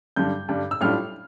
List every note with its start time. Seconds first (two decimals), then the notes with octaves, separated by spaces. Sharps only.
0.16 G2 D3 G3 D4 G6
0.48 G2 D3 G3 D4
0.71 E6
0.81 A2 G3 D4 F4 F6